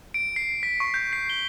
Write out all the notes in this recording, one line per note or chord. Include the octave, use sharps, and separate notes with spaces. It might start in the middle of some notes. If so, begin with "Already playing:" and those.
D7
C7
B6
C#6
G6
C7
G7